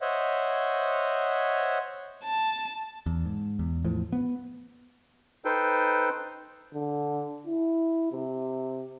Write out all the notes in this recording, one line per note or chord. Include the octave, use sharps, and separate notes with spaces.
C5 C#5 D#5 E5 F#5
A5
E2
G#2
E2
E2 A2 F3
B3
D#4 A4 B4 C5 G5
D3
E4
C3